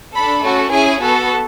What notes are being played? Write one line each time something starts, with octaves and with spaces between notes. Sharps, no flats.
D4 A4 B5
A3 C#4 F#4 A4
C#4 E4 G#4 G#5
B3 F#4 A4